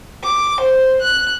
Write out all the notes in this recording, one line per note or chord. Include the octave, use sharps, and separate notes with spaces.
D6
C5
F#6